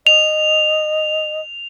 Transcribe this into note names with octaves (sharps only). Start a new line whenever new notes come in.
D#5 F7